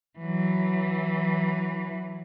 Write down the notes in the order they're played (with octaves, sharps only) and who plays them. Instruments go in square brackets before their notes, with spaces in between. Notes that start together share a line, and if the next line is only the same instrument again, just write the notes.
[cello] E3 F#3